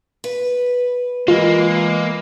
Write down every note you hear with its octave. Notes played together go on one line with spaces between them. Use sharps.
B4
E3 G#3 A#3 F4